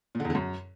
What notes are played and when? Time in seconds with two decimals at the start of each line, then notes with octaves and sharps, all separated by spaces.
0.15 A#2
0.20 D3
0.25 E2
0.30 D3
0.35 F#2